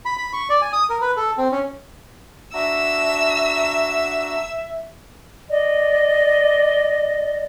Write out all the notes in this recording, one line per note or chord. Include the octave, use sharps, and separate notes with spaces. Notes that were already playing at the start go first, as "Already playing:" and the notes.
B5
B5
C#6
D5
G#5
D#6
A#4
B4
A4
C4
C#4
D4 F#4 E5 A#5 E6
D5 D#5